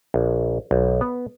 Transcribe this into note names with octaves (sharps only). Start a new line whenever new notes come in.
A#1
B1
B3